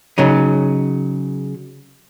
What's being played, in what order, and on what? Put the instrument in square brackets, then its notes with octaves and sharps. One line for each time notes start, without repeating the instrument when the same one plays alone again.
[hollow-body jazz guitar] C#3 F#3 D#4